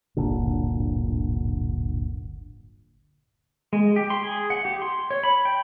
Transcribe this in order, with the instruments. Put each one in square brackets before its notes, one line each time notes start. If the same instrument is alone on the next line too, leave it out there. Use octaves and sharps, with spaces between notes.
[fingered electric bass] D1 G1 A#2 D3
[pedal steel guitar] G#3
G4
C6
G#4
F#5
G4
C6
C#5
B5
G5